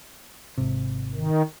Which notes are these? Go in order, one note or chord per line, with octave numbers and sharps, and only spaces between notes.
G#1 C3
D#3